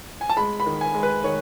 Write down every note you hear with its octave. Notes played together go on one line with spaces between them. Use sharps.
G#5
A5
G#3 B5
B5
D#3
G#5
G#3
B4
D#3 C#5